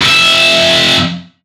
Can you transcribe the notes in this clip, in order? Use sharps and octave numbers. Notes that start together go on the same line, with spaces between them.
F2 E5